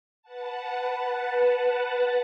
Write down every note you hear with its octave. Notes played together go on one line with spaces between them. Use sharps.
B4 F#5 A5